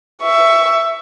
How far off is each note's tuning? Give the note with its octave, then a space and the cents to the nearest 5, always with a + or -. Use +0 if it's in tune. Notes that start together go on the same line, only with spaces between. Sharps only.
E5 +10 C#6 +15